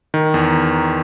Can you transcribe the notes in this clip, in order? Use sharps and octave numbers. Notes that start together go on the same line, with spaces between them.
D#3
E2